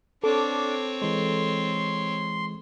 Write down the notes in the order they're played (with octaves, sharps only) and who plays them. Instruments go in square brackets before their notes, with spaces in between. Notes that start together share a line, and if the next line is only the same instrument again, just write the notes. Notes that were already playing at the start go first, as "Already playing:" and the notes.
[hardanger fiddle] C4 C#5 [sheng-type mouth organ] D4 D6 [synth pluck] A4
[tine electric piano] E3 G#3 [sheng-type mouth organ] C6